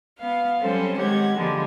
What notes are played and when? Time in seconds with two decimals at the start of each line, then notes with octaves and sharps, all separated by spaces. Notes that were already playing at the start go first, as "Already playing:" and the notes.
0.18 B3 F5
0.61 F#3 G3 C4 C#4 A4 C5
0.96 D#3 G#3 G4 F#5 G#6
1.35 D3 F3 G3 G#3 A#3